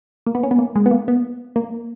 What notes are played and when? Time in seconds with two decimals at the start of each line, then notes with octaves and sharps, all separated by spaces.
0.26 A#3
0.35 B3
0.43 C#4
0.51 B3
0.59 A#3
0.76 G#3
0.86 B3
0.91 A#3
1.08 B3
1.56 A#3